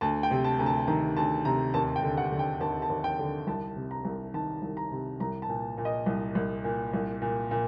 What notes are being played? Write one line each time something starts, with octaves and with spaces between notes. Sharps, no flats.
D2 A5
G5
C3
A5
D2 A#5
A5
D#3 A#5
D2 A5
C3 A#5
D#2 A5
G5
D3
F#5
D3
G5
D#2 A5
A5
D#2
G5
D3
C2 A5
C3
A#5
C2
D#3 A5
C2
A#5
C3
C2 A#5
A5
A#2
A#2
D#5
C2
C2
A#2
C2
A#2
A#2